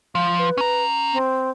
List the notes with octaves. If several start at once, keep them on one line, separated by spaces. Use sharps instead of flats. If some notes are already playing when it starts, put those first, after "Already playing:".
F3 F5
B4
C#4 A#5
C4